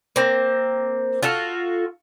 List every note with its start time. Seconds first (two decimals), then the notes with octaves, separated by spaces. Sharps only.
0.16 A#3 C4
1.23 F4 F#4 A4